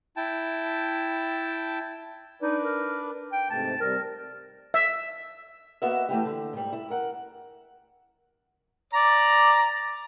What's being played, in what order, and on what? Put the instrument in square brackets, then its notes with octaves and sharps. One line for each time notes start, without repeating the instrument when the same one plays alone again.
[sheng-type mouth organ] E4 G5 A5
[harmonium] D4 B4 D5 [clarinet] D#4
[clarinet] A#4
G5
[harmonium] G#2 C3 A3 [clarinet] A5
[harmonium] C3 G3 [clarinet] A#4
[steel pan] E5
[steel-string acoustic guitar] A#3 B3 F#4 D#5 E5
E3 A3 E4 G4
D3
G#2 G3
E4
A#4 F#5
[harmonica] D5 A#5